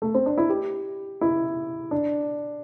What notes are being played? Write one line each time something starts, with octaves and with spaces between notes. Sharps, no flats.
A3
C4
D4
E4
G4
E4
D4